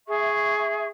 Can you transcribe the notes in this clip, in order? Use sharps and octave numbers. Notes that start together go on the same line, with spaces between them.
G#4 E5 C#6